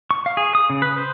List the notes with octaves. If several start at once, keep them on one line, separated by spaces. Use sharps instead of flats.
C#6
F5
G#4
D#6
C#3
B4
C5